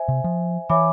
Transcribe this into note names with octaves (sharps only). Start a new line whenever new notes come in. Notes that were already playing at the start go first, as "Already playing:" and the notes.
Already playing: C5 E5 G#5
C3
F3
E3 C#5 E5 G#5 B5 D6